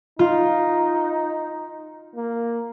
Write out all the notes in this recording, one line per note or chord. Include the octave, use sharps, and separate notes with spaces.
D#4 F4
A#3